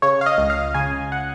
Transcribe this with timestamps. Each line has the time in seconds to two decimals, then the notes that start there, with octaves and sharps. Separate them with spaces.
0.02 C#3 C#5
0.21 F5
0.26 D#5
0.38 C#2
0.50 F5
0.74 C#3 G#5
1.12 F#5